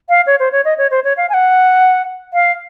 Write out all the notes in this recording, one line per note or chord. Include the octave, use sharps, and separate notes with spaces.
F5
C#5
C5
C#5
D#5
C#5
C5
C#5
F5
G#5
F#5
F5